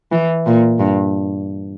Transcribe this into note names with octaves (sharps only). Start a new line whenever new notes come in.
E3
A#2
G2